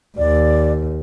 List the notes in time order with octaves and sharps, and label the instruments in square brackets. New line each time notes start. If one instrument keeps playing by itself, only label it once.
[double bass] D#2 [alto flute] D5